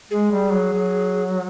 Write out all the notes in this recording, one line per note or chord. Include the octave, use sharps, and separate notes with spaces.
G#3 G#4
G3
F#3
F#3